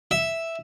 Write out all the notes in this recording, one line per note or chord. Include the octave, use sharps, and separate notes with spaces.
E5